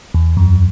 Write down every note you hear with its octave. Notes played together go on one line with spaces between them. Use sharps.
E2
F#2